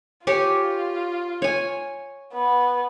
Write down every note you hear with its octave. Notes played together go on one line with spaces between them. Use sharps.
F4 G4 C#5 G#5
C#5 G#5
B3